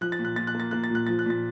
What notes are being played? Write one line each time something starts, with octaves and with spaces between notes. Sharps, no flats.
F3 F#6
A6
A#2
F#6
A#2 A6
F#6
A#3 A6
A#3 F#6
A6
A#2 F#6
F3 A6
F#6
A#2 A6